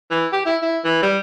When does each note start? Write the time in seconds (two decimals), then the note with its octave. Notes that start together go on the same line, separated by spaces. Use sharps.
0.11 E3
0.33 G4
0.46 E4
0.62 E4
0.84 E3
1.02 G3